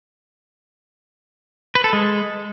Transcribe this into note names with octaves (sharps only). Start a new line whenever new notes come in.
B4
A4
G#3